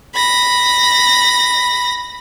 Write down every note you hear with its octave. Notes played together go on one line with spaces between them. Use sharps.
B5 A#6